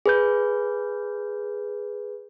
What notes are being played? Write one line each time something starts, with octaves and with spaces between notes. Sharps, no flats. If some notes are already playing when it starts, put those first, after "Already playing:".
G#4 B4 G6